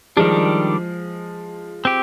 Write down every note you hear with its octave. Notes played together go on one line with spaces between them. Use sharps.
D#3 F3 G3 G#3 D4
C4 G4